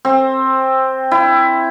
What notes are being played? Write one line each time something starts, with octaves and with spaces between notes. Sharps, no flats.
C4
E4